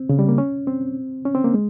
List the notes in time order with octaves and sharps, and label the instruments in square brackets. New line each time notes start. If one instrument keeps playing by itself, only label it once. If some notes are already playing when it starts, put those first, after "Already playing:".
Already playing: [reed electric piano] C4
C#3
G3
A#3
C#4
C4
C#4
C4
A#3
G#3